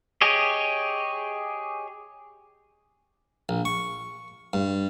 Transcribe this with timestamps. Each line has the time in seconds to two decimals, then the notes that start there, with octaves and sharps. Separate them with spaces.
0.21 G4 G#4 C#5 D#5
3.49 A#1
3.65 C#6
4.53 G2